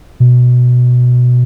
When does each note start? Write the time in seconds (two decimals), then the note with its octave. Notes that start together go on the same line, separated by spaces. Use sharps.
0.20 B2